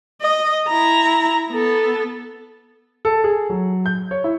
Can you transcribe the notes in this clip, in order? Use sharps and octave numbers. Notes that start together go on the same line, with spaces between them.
D#5
E4 A#5
B3 A4
A4
G#4
F#3
G6
C#5
E4